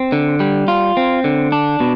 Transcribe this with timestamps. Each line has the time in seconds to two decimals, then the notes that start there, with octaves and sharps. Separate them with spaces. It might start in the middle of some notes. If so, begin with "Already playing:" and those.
Already playing: C4
0.12 D3
0.40 G3
0.68 F4
0.97 C4
1.24 D3
1.52 D4
1.80 B2